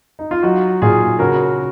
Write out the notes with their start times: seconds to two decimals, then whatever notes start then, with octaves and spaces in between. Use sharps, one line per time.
0.19 D#4
0.31 F4
0.43 F#3 D#4 F#4
0.82 A#2 F4 G#4
1.19 C#3 F#4 A#4